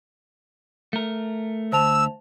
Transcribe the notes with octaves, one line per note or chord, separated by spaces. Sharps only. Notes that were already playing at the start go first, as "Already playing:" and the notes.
A3 A#4
D2 C5 A5 E6 F7